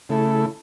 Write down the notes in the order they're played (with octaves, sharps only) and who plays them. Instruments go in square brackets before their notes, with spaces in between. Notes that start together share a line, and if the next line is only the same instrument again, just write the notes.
[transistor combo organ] C#3 A3 E4 A4